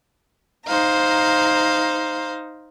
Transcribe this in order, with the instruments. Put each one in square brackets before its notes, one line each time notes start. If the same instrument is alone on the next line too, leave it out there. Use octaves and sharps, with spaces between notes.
[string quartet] D#4 C5 F5 A#5